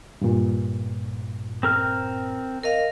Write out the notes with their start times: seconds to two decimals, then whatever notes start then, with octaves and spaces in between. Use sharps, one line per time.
0.22 G2 A#2
1.63 C4 A#4 F6
2.63 A#4 D#5 F5